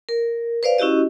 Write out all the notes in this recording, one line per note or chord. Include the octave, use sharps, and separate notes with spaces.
A#4
B4 C5 D5 F5
C#4 E4 F#4 G4 D#5